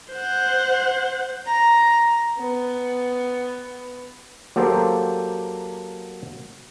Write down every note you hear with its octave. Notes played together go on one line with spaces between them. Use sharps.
C5 F#5
A#5
B3
F#3 A#3 G4 A4 C5